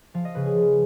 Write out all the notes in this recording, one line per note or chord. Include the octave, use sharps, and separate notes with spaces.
F3 F5
D#5
C#3 B4
G#4
F3